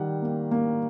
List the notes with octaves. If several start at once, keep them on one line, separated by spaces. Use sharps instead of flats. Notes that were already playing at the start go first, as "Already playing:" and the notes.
Already playing: D#3 G3 F#5
A#3
A#3